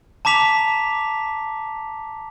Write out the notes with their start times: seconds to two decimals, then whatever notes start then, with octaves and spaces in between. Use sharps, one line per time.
0.25 A5 A#5 D6 B6 F7